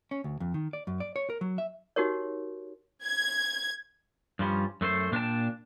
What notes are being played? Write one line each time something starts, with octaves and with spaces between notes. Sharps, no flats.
C#4
D2
F2
D#3
D5
F#2
D5
C#5
A#4
F#3
E5
D#4 F#4 G4 A#4 C#5
G#6
G2 F3 G3 C#4
F#2 A3 F4 C5
A#2 D4 G4 G5 A5